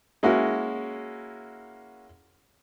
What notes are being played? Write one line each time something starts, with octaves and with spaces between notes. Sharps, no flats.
G#3 A#3 C#4 E4 F#4